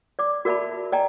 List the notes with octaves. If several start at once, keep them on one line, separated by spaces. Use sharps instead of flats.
D5 D6
F#4 A#4 D5 E5 A5 B5
D5 D#5 G5 G#5 A#5